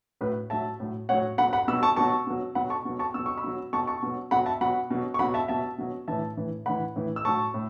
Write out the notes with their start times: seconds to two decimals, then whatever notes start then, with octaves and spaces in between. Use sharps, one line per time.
0.21 A2 F#3 B4
0.50 A2 F#3 E5 A5
0.80 A2 F#3
1.09 A2 F#3 C#5 F#5
1.38 B2 F#3 F#5 B5
1.53 F#5 B5
1.68 B2 B5 E6
1.72 F#3
1.83 A5 C#6
1.96 B2 F#3 A5 C#6
2.27 B2 F#3
2.55 B2 F#3 F#5 B5
2.70 A5 C#6
2.85 B2 F#3
2.99 A5 C#6
3.14 B2 F#3 E6
3.26 C#6
3.37 B5 E6
3.44 B2 F#3
3.73 B2 F#3 A5 C#6
3.87 A5 C#6
4.02 B2 F#3
4.31 B2 F#3 F#5 B5
4.46 E5 A5
4.61 B2 F#3 F#5 B5
4.90 B2 F#3
5.14 C#6
5.19 F#3 F#5 B5
5.24 B2
5.34 E5 A5
5.48 B2 F#3 E5 A5
5.78 B2 F#3
6.08 A2 E3 E5 A5
6.37 A2 E3
6.66 A2 E3 F#5 B5
6.96 A2 E3
7.16 E6
7.25 A2 F#3 A5 C#6
7.54 A2